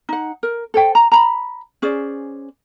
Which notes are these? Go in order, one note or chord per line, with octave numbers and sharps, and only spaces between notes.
D#4 F#5
A#4
A4 C5 G5
A#5
A#5 B5
C#4 G#4 C5 D5